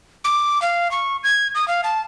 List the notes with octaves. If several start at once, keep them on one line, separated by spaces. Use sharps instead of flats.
D6
F5
C#6
G#6
D#6
F5
A5